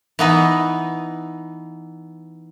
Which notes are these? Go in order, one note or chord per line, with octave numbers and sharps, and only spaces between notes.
E3 B3 D#4